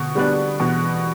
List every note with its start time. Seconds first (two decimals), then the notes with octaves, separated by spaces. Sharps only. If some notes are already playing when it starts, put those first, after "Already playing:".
Already playing: B2 D3
0.15 G3 B3 D4
0.60 B2 E3